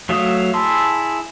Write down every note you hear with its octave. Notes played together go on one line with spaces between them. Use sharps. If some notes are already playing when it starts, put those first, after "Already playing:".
F#3 A3 E5 F5 D#6
E4 G#4 A5 C6 E6